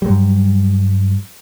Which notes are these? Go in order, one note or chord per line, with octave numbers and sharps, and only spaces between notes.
G2 F#3 G3